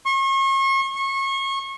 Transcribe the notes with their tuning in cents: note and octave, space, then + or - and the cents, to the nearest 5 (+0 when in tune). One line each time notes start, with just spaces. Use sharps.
C#6 -40
C#6 -30